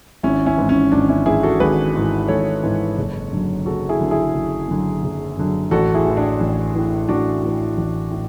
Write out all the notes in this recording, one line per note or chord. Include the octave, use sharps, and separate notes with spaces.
G#1 C#4 E4
C#4 E4
G#2 E3
C#4
G#1 D4
C#4 E4
G#2 E3 E4 G#4
F#4 A4
G#1 G#4 B4
G#2 E3
G#1 A4 C#5
G#2 E3
F#1
F#2 D3 F#3
F#1 F#4 A4
E4 G#4
F#2 D3 F#3
E4 G#4
F#1
F#2 D3 F#3
F#1
F#2 D3 F#3
A1 F#4 A4
E4 G#4
A2 E3
D4
A1
A2 E3
A1 D4 F#4
A2 E3
A1
A2